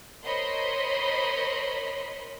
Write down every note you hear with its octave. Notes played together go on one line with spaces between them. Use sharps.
A#4 C5 C#5 D#5 B5 C6